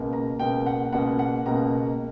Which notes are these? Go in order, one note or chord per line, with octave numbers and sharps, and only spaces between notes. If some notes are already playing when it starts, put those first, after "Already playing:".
Already playing: C#2 B2 A#3
A#5
C#2 B2 A#3 G5
F#5
C#2 B2 A#3 F#5
F#5
C#2 B2 A#3 A#5